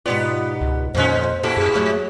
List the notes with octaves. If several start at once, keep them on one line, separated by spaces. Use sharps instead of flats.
G#2 B2 B3 F4 G4 D5
C#2
F2 A#2 D#3 F3 G#3 C#4 C5
A2 E4 G4 A4
F#2 G#4
F#3 A3